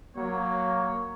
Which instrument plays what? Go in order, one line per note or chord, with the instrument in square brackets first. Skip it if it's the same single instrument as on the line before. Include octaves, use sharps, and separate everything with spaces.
[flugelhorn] F#3 [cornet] A#3 [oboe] C#5